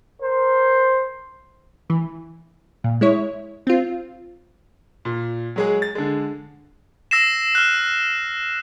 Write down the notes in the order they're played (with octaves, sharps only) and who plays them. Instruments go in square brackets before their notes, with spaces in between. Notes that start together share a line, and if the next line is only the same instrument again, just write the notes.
[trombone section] A#4 C5
[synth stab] E3
A#2
G#3 E4 C#5
C4 F4
[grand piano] A#2
F#3 G#3 G#4
A6
D3 G#3
[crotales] E6 A#6 C7 E7
F6 F#6